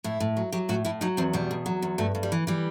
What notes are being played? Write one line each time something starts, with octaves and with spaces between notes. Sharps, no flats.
A2 E4
A2
F#3
F#3 G4
A2 F#4
A2 E4
F#3 D#4
E2 C4
B2 G3
E2
F#3
E2
G2 A3
G2
G3
E3
E3 G3